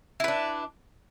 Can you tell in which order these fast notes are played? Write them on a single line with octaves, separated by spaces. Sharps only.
E4 B4 D4